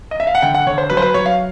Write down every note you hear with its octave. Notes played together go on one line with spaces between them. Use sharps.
D#5
E5
F5
F#5
D3 G5
F#5
D3 C#5
C5
F#3 B4
C5
B4
F#3 C#5
F5